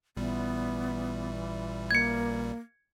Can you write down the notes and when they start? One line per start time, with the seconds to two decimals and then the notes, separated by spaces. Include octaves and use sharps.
0.17 A1 A#2 E3 G3 B3
1.91 A#3 G#6 C#7